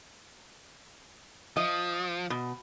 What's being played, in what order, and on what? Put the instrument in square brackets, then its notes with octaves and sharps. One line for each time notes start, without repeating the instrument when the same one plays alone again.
[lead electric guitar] F3 [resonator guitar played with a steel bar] D#5
[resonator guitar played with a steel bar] B2